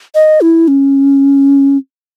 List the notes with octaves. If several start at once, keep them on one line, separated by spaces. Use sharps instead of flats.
D#5
E4
C#4